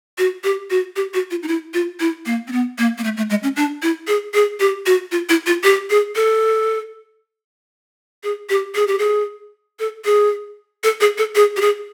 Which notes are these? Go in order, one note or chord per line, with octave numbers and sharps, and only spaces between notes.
F#4
G4
F#4
G4
F#4
F4
D#4
E4
F4
E4
A#3
C4
B3
A#3
A#3
A3
A3
G#3
C#4
D4
E4
G#4
G#4
G4
F#4
F4
E4
F4
G4
G#4
A4
G#4
G4
G#4
G4
G#4
A4
G#4
A4
G#4
A4
G#4
G4
G#4